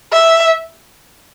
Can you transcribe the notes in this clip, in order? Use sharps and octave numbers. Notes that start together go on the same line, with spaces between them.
E5